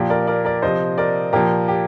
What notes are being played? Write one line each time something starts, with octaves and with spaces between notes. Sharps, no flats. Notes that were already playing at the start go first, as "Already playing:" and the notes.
Already playing: A#2 F3 G4
A#4 D5
A#4 D5
A#4 D5
C3 F3 C5 D#5
A#4 D5
A#2 F3 G4 A#4
G4